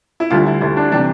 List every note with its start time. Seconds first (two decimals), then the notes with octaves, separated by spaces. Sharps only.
0.20 E4
0.30 D2 D3 G3 F4
0.47 E4
0.61 D2 D3 G3 E4
0.77 D4
0.92 C3 E3 G3 D4